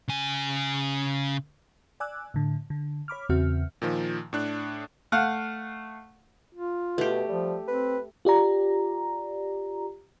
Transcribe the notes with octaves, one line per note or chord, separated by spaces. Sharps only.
C#3 G#5
D5 G#5 D6 E6 F#6
A2 D3
D3
C#5 B5 D6 F6
E2 C#3 C4 F#4 E5 F6
A#2 D#3 F3
A2 D4 F#6
A3 F5 F#5 F#6
F4
B2 A3 G4
F3 G3
C4 B4
F4 G4 D5 A#5